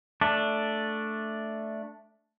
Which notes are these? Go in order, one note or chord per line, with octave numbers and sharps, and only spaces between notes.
A3 D4